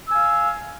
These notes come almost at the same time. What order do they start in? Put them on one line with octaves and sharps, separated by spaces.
E6 G#5 F5